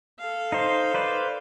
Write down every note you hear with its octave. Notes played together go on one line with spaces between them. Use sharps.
A4 F5
D#4 C5
B4 C5 D5